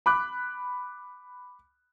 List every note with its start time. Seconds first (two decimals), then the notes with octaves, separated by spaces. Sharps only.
0.06 B5 D6 F#6